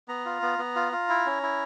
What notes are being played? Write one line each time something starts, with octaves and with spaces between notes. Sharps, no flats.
B3 A#5
F4
B3
B3
F4
F4
E4
C#4
E4